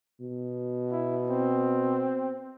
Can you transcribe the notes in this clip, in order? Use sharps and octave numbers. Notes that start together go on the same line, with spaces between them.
B2
E4
C4